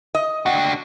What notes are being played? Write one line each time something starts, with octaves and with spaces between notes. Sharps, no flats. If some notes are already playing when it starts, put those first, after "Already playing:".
D#5
D4 F#4 F#5 G5